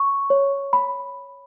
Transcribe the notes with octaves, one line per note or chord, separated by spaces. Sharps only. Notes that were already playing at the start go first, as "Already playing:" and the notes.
Already playing: C#6
C#5
B5